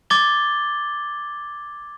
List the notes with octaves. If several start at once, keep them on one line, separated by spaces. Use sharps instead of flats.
D6 G#6 A6 G7